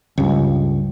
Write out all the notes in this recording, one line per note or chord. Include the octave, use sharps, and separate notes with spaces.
C#2 G2